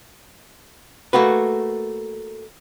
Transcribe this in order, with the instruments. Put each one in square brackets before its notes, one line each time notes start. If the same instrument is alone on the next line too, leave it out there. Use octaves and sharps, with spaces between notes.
[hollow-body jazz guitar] A3 A#3 F#4 B4